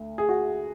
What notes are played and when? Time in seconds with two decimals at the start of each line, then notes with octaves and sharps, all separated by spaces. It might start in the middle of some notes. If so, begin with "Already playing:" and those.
Already playing: D2
0.18 G#4
0.29 F#4